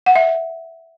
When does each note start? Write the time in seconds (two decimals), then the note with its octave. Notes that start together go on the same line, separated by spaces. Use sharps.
0.06 F#5
0.16 E5